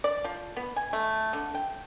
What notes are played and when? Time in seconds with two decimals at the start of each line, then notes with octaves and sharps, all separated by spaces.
0.04 D5
0.24 F3
0.56 B3
0.76 G#5
0.93 A3
1.33 D3
1.55 G5